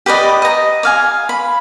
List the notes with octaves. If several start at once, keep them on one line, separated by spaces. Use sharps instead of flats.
G4 B4 D5 D#5
D#5 A#5
D5 F5 G#5
B5